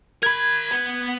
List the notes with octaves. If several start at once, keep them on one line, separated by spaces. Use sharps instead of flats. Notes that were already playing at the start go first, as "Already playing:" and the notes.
A#4 B5 G#6
B3 B4